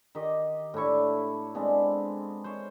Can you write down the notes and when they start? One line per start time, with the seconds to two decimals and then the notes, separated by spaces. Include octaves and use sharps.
0.15 D#3 G4 D#5
0.74 A2 D4 E4 C#6
1.54 G#3 B3 C4 D4
2.44 C5 C#5 F5